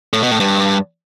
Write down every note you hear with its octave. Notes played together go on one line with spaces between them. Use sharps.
A2
B2
A2
G2